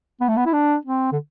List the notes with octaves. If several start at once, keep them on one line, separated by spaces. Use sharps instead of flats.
B3
A3
B3
E4
D4
C4
D3